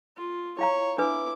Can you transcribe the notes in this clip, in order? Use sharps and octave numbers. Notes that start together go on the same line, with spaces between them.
F4
E4 C#5 F5 A#5
D4 E4 B4 D6